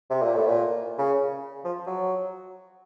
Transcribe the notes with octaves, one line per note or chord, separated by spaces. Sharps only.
C3
A#2
A2
A#2
C#3
F3
F#3